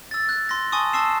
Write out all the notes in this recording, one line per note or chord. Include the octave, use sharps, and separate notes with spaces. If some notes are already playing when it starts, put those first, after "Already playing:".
E6 A6
F#6
C6 A#6
G#5 A5 C6 C#6 D#6
A5 C6 C#6 E6 C7 E7